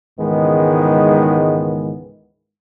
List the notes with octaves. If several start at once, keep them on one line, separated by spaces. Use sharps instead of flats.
C#2 G#2 D#3 E3 G#3 B3